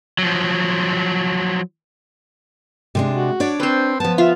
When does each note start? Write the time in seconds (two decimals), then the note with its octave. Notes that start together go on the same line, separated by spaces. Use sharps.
0.19 F3 F#3
2.95 C3 G#3 D4
3.14 F#4
3.40 D4 C#5 D5
3.60 C4 B4 C5
4.00 F3 B3 A5
4.18 F4 E5